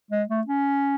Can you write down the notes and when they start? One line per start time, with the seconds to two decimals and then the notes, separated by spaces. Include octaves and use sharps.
0.11 G#3
0.29 A3
0.47 C#4